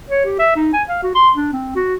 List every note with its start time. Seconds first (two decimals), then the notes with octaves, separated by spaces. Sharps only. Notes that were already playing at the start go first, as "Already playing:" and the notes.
0.10 C#5
0.25 G4
0.39 E5
0.56 D#4
0.74 G#5
0.89 F5
1.03 F#4
1.15 C6
1.36 D4
1.53 C4
1.76 F#4